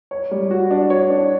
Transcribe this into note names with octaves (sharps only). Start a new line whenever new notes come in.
C#5
G3
F#4
D4
C#5
D4